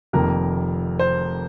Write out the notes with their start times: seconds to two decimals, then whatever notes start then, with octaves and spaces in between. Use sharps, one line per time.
0.13 F1 F2 D#3 A#3 A#4
0.99 C5